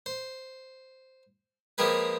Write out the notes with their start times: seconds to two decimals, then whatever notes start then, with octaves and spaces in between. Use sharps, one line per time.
0.06 C5
1.78 F3 G#3 A#3 G4 G#4 B4